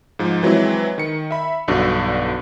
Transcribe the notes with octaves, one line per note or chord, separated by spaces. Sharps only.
G#2 F3
E3 F#3 G#3 C4 E4
D#3 C#7
E5 B5
B1 G2 D3 F#4